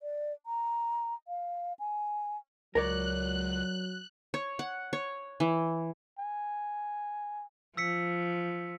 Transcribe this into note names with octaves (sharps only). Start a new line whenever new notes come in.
D5
A#5
F5
G#5
C#2 F#3 A#4 C#5 D5 F#6
C#5
F#5
C#5
E3
G#5
F3 E6 B6 C#7